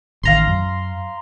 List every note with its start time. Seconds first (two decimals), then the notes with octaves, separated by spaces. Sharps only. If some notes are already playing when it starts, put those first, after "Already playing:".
0.23 A1 D#3 F5 A#5 C6
0.47 F#2